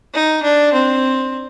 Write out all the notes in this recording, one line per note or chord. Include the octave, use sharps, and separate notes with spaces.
D#4
D4
C4